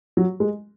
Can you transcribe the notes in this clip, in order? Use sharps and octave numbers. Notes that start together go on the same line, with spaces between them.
F#3
G#3